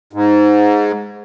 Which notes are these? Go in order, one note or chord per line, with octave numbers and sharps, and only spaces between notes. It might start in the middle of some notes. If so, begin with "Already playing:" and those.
G#2